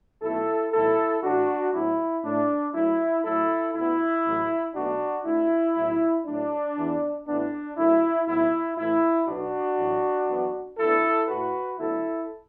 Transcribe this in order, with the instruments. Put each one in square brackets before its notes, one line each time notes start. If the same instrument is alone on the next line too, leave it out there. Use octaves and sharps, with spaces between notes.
[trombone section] B1 B2 A3 E4 A4
B1 A2 E3 A3 E4 A4
A1 A2 A3 D4 F#4
A2 F#3 B3 E4
A2 A3 D4
F#2 F#3 A3 E4
A2 F#3 A3 E4 A4
D2 D3 B3 E4
A1 A2 F#3 A3
B1 B2 A3 D4 F#4
D2 D3 A3 E4
B1 A2 F#3
A2 F#3 A3 D4
E2 E3 B3
A1 A2 E3 B3 D4
F#2 D3 A3 E4
B1 A2 F#3 B3 E4
A2 E3 A3 E4
B1 B2 B3 D4 F#4
A1 A2 F#3
F#2 E3 B3
D2 D3 B3 E4 A4
A2 A3 F#4 B4
D2 D3 F#3 B3 E4 A4